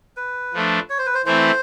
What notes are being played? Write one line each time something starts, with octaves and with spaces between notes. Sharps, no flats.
B4
F3 A3 D4
C#5
C5
B4
C5
E3 A3 C4 E4 C5